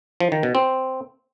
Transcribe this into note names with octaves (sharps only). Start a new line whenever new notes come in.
F3
D#3
B2
C4